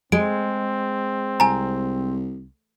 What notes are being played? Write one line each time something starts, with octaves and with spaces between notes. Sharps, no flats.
G#3 C4 D7
C2 G#5 A#5